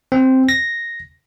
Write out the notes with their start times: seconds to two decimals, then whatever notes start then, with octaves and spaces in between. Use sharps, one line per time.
0.12 C4
0.49 A#6